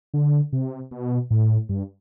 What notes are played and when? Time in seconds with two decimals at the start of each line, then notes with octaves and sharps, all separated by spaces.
0.14 D3
0.53 C3
0.91 B2
1.31 A2
1.69 G2